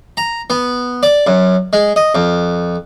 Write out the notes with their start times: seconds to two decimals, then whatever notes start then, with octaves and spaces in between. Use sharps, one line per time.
0.17 A#5
0.50 B3
1.03 D5
1.27 F#2
1.73 G#3
1.96 D#5
2.15 F2